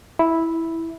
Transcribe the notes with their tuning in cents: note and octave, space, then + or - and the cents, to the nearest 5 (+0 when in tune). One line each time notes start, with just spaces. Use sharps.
E4 -5